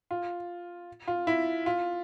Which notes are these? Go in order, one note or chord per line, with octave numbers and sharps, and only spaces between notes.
F4
F4
E4
F4